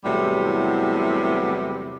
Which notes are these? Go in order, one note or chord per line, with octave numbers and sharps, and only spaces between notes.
E2 A2 C3 F#3 G3 B3